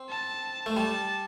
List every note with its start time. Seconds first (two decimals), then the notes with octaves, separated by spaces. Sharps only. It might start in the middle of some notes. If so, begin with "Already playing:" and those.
Already playing: C4
0.10 A5
0.66 A3
0.76 G3 A5